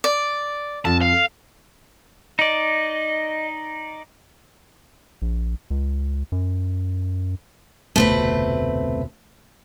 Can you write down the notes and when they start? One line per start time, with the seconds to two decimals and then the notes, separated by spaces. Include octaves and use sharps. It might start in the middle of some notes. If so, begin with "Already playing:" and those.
0.04 D5
0.85 F2 A5
1.01 F5
2.39 D#4 D5 D#5
5.22 A#1
5.70 C#2
6.32 F#2
7.96 F1 D2 B2 A3 C4 B4